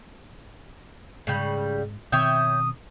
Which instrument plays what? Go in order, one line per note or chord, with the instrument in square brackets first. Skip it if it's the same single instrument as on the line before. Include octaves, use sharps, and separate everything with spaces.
[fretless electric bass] G#2 [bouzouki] C#3 G3
[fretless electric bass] B2 D#3 C4 [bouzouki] C#5 E5 G5 [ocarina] D#6